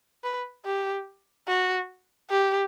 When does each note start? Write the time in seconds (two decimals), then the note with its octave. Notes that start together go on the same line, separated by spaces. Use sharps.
0.24 B4
0.65 G4
1.48 F#4
2.31 G4